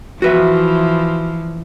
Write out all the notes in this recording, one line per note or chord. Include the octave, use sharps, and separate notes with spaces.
E3 F3 F#4 B4 E5